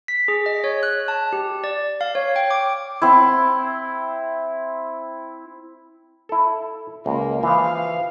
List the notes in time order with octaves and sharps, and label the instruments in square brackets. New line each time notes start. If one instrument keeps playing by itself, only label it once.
[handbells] B6
G#4
D#5
C#5
F#6
A5
G4
D5
F5
C#5
G5
D6
[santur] C4 E4
[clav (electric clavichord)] E4 A4
[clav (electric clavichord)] C#2 [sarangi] A#3
[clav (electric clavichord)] E3 F3 [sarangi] F5